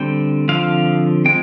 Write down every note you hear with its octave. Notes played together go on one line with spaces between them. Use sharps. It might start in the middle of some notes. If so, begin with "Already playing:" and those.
Already playing: D3 G3 C4 G5
D3 F3 C4 F5
F3 G#3 C4 G5